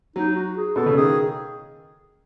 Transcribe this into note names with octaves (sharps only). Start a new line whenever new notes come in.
F#3 D#4
F#4
G#4
B2 A4
C#3
D#3 G#4